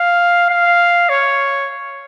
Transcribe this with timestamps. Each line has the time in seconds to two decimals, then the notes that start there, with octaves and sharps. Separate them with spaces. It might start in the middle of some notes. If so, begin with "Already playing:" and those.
Already playing: F5
0.50 F5
1.09 C#5